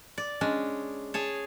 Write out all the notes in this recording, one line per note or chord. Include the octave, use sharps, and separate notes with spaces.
D5
G#3 C#4 D4
G#4 C#5 A5